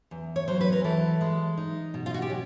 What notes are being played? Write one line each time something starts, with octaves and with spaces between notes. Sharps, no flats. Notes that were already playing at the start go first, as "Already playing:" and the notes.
E2
C#5
F#3 C5
B4
A#4
E3 A4
G#3
D#4
B2
F4
F#4
G4
C#4